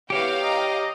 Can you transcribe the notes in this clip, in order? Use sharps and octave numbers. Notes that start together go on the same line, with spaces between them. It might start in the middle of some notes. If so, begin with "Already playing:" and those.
B3 E4 F#4 G4 C#5 F5 G5
D#5 A#5 D6